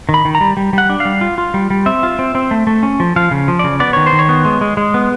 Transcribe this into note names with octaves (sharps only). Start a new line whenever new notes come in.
D#3
B5
D#3
A#5
G3
G3
G3 F#5
D4
F5
G3
F4
F4
G3
G3
C4 E5
F4
C4
C4
A3
A3
C#4
F3
F3 F5
C#3
F3
C#3 D5
B3 D5
D#3 C#5
C5
D#3
C#5
B3
G#3
G#3
G#3
B3